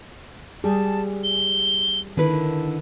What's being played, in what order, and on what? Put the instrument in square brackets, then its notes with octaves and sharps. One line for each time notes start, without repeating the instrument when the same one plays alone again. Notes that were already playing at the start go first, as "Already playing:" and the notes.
[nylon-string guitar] G3 [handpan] G#4 [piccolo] A5
[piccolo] G7
[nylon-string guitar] D3 E4 B4 [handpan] D#3 [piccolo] A5